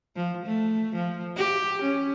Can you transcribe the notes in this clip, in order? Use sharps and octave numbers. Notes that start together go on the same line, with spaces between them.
F3
A3
F3
G4
C#4